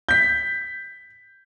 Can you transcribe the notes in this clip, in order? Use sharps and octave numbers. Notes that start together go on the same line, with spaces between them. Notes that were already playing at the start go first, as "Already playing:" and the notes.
G6 B6